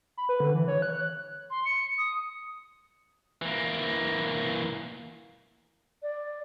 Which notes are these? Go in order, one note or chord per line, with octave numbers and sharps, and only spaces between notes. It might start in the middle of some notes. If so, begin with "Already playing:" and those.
B5
B4
D3
E3
C#5
F#6
C6
C#7
D#6
E3 A#3
D5